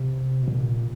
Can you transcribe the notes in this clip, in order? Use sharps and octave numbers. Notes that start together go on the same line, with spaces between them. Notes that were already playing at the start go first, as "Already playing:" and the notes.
Already playing: C3
B2
A#2